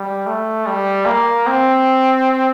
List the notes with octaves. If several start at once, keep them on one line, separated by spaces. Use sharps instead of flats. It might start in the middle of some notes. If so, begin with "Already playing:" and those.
Already playing: G3
A3
G3
A#3
C4